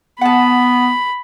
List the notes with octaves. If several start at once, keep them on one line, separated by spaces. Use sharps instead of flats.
B3 F#5 A5 B5